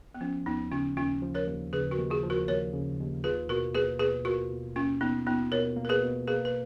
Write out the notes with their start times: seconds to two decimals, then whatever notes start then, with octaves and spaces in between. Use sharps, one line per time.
0.14 B3
0.21 F3 C#4
0.46 D#2 B3 D#4
0.71 C#3 C#4 F4
0.97 D#2 C#4 F4
1.22 F3
1.35 A#4 C#5
1.47 D#2
1.73 C#3 G#4 B4
1.91 F#4 A#4
1.98 D#2
2.10 F4 G#4
2.23 F3
2.30 F#4 A#4
2.48 D#2 A#4 C#5
2.73 C#3
2.99 D#2
3.24 F4 G#4 B4
3.49 B2 F#4 A#4
3.75 A#3 G#4 B4
3.99 B2 G#4 B4
4.25 F4 F#4 A#4
4.50 B2
4.76 A#3 C#4 F4
5.01 B2 B3 D#4
5.26 B3 D#4 F4
5.51 B2 A#4 C#5
5.76 A#3
5.85 A#4
5.89 G#4 B4
6.02 B2
6.27 A#3 G#4 B4
6.45 B4